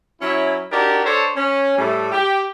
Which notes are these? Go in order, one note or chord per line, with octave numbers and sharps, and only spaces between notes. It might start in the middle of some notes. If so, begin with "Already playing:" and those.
F#3 C#4 E4
D4 D#4 F#4 G4 A#4
D4 A4 C5 C#5
C#4
A2 G3 A3
G4